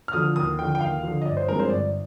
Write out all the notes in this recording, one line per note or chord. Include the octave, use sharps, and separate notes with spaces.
F6
D3 F3 D#6
D#2 D#6
D3 F3 G5
G5
D#2 F5
D3 F3
D#5
G1 D5
C5
G2 F3 G#3 C4 A#4
C5
G1 D5